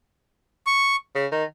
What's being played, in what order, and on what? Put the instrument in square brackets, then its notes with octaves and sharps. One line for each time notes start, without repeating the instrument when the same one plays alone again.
[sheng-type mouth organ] C#6
[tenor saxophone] C#3
D#3